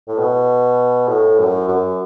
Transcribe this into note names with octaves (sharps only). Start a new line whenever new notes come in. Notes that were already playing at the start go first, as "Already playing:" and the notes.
A2
B2
A2
F#2
F#2